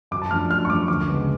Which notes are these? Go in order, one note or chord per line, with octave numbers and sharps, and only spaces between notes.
F#2 D6
A5
F3 A3 D4 F6
F#2 F6
C#6
F3 A3 D4 D6
D2 D6
C#3 G#3 B3